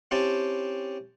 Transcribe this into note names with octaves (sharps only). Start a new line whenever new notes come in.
C4 C#4 E4 G4 A5